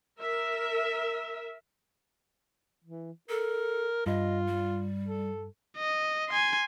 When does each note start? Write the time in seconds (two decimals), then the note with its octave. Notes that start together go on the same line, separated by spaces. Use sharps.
0.20 A#4 E5
2.84 E3
3.30 A4 A#4
4.06 G2 F4 D#5
4.48 G3
5.08 A4
5.77 D#5
6.29 G#5 C6